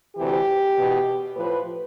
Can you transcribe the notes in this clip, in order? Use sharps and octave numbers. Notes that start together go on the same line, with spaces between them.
D2 C3 E3 G4
E2 B2
A2 F3 B4